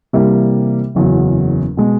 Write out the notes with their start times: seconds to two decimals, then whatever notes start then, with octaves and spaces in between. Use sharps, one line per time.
0.13 C3 E3 G3 A#3
0.95 F#1 E2 C#3 F#3
1.77 B2 G#3